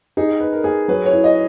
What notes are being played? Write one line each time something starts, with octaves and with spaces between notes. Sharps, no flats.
D#4 G#4
B4
A#4
G#4
F#3 B4
C#5
E4
D#5